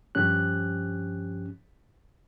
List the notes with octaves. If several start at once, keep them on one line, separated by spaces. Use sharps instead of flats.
G2 F3 C#4 G4 F#6